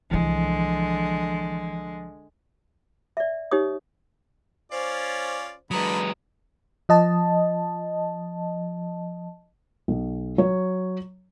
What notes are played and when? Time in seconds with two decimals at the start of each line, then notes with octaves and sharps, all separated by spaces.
0.11 C2 D3 E3 F3 G#3
3.17 D5 E5
3.51 D#4 G4 C#5 D#6
4.72 C#4 F4 C5 D5
5.71 D3 F#3 G#3 B4 A#5 B5 D#6
6.89 F3 D#5 A5
9.88 B1
10.38 F#3 C#5